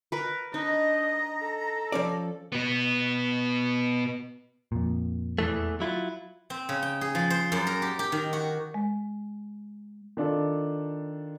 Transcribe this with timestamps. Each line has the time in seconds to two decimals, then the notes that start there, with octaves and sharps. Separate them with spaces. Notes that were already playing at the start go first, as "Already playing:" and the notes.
0.12 A#4 B4
0.54 D4 D#4 D#5 A#5
1.41 A4
1.92 F3 C#4 D5
2.52 B2 B3
4.72 F2 A#2
5.38 E2 E3 A3
5.80 F#3 E4 F4
6.50 C4
6.69 C#3
6.83 G5
7.01 G#4
7.15 F3
7.30 C5
7.52 F#2
7.67 A#4
7.82 G4
7.99 G4
8.12 D#3
8.33 F#4
8.74 G#3
10.17 D#3 D4 F4 A4